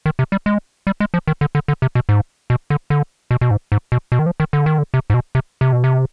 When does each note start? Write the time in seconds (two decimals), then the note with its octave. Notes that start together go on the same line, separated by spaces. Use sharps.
0.06 D#3
0.19 C3
0.32 G3
0.46 G#3
0.87 G3
1.00 G#3
1.14 F3
1.27 D#3
1.41 D3
1.55 D3
1.68 D3
1.82 C3
1.95 B2
2.09 G#2
2.50 B2
2.70 D3
2.90 D3
3.31 B2
3.41 B2
3.51 G#2
3.72 G#2
3.92 B2
4.12 B2
4.19 D#3
4.26 F3
4.40 D#3
4.53 D3
4.66 D#3
4.78 D3
4.94 C3
5.10 G#2
5.14 B2
5.35 C3
5.61 C3
5.73 B2
5.84 C3